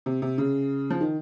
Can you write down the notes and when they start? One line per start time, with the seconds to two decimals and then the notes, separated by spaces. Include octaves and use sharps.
0.06 C3
0.22 C3
0.38 C#3
0.90 F3
1.01 D#3